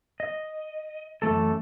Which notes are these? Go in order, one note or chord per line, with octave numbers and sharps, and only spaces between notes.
D#5
F#2 E3 A3 A4